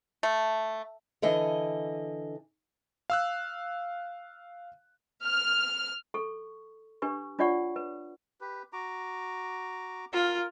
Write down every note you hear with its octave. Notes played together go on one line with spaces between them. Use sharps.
A3
D3 E3 D#5 G#5
F5 E6 F#6
F6
A4 C#6
D4 G4 B4 C#6
D4 F4 C#5 D5 F#5 C#6
B4
G4 B4
F#4 A#5 D6
F4 A#4